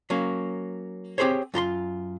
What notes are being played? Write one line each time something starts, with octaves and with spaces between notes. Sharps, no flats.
F#3 A#3 C#4
C4 G4 G#4 C5 C#5
F#2 F4 A#5 C6